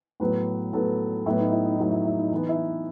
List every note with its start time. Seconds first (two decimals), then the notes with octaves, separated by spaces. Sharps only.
0.20 A2 F#3 B3 B4
0.73 A2 F#3 B3 A4
1.26 A2 F#3 B3 E4
1.39 D#4
1.52 E4
1.66 D#4
1.78 A2 F#3 B3 E4
1.92 E4
2.05 E4
2.19 D#4
2.32 E3 B3 D#4
2.49 E4